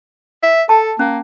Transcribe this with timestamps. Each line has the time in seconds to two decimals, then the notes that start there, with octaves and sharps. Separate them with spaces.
0.43 E5
0.69 A4 A5
0.99 A#3 C#4